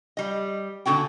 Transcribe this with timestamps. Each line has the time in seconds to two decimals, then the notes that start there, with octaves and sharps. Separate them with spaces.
0.17 G3 D#5
0.86 A#2 D3 F4 F#4 G5